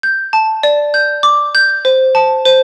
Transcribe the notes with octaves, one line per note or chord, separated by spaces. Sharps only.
G6
A5
D5
G6
D6
G6
C5
A5
C5